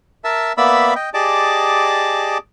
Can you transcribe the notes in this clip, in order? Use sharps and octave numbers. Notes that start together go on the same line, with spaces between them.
A#4 E5 A5
A#3 B3 D5 E5 B5 E6
D#5 G5
G4 G#4 D5 D#5 A5 D6